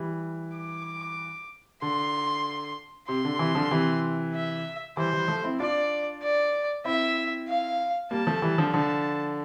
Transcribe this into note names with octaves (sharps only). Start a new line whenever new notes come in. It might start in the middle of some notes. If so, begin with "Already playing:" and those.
Already playing: E3 G3
D6
D3 C6
C3 C6
D3
C3 E3
D3 F3
C3 E3
E5
E3 G3 C5
E3 G3
F3 A3
C4 E4
D4 F4 D5
D5
C4 E4 E5
F5
G3 A#3 A5
F3 A3
E3 G3
D3 F3
D3 F3 A5